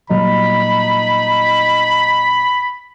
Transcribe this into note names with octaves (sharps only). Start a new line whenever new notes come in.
A#2 F#3 G3 D#4 B5